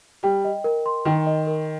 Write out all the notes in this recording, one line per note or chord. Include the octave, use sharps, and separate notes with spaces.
G3 G5
D#5
A#4
C6
D#3 G5
D#5
A#4